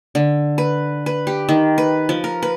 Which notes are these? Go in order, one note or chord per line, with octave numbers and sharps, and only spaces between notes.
D3
B4
B4
G4
D#3
B4
F3
A#4
B4